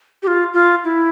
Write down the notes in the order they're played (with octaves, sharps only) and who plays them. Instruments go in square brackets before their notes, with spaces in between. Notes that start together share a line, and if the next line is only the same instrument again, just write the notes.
[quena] G4
F4
F4
E4